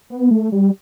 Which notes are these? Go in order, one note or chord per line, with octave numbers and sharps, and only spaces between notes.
B3
A3
G3